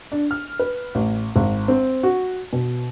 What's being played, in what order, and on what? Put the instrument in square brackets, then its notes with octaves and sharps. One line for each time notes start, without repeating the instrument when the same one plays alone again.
[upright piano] D4
F6
B4
A1
G#1
C4
F#4
B2